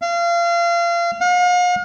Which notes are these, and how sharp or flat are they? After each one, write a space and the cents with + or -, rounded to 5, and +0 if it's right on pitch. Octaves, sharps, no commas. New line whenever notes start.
F5 -30
F5 +45